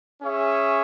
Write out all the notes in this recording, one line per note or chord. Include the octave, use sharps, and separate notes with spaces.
C#4 G#4 C#5 E5